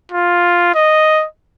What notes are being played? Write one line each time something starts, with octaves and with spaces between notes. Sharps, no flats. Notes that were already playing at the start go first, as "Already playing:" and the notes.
F4
D#5